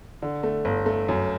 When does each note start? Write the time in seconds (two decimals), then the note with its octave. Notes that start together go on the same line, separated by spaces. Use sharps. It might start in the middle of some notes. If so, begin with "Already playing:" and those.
0.22 D3
0.43 A3
0.65 G1
0.86 A3
1.08 F#2